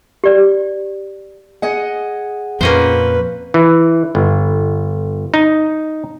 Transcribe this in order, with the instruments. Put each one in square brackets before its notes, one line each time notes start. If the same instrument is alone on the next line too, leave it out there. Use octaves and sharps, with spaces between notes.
[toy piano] G4 D5
[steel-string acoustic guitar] G#4 D#5 F#5
[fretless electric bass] F2 A#2 [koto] A#3 C#4 C5 [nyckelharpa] B4
[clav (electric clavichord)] E3
G1
D#4